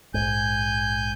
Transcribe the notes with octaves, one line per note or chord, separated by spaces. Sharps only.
A#1 G#2 G#5 G6